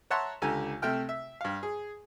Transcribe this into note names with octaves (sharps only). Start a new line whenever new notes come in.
C#5 E5 F#5 A5 A#5 C6
C#2 D3 G4 G#5 A#5
C3 A3 G5 F6
E5
G2 F5
G#4